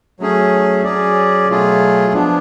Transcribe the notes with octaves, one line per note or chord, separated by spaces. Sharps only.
F#3 A3 C#4 G#4
F#3 C#4 G#4 D5
B2 F#3 A3 F4 G#4
F3 B3 D4